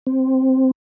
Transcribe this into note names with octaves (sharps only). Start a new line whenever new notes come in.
C4